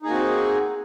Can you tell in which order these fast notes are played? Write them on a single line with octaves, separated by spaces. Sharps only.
D#4 G#4 A#3 F#4 C4